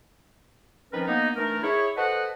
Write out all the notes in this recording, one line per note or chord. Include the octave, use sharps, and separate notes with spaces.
D#3 F3 C4 C#4 A#4 B4
A#3 B3 D#4
E3 A3 D4 D#4 A#4
E4 G#4 C#5
A4 B4 C5 D#5 F#5